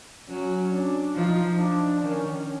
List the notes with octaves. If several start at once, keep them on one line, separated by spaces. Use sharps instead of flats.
F#3 C#4
D4
F3 D#4
D4
D#3 C#4